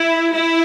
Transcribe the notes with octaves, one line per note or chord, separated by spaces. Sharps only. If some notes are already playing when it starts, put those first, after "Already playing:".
Already playing: E4
E4